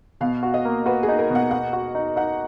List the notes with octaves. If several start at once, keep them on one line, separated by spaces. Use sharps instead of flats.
B2 F5
F#4
D#5
A#3
F#4 B4
G#4
D#4
A#4
B2
F#5
B2 F#5
F#4
D#4
D#4 F#5